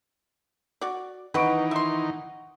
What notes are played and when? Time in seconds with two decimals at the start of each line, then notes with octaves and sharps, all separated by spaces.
0.81 F#4 D5
1.34 D#3 E3 D#4 B4 D#5 F#5 C#6 D7
1.71 E5 C6